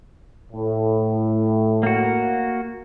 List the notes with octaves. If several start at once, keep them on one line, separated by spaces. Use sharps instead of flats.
A2
A#3 F#4